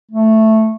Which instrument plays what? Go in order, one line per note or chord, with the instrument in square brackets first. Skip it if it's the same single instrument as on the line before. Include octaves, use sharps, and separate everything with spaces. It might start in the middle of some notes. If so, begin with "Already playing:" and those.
[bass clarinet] A3